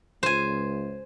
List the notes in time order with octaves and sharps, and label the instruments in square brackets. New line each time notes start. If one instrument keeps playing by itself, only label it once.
[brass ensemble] C#2 [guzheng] C5 G#5